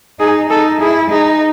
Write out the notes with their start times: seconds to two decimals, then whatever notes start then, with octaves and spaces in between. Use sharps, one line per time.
0.20 D#4 G#4
0.50 D#4 A4
0.81 E4 G#4
1.11 D#4 G#4